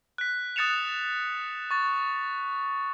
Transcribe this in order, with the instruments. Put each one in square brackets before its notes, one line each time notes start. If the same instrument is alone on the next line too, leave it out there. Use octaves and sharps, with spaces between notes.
[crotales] F#6 B6
D#6 F#6 A6 C#7 E7 F7
C#6 A6